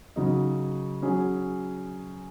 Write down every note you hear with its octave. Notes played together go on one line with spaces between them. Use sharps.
C#3 F#3 D#4
F#3 C#4 G#4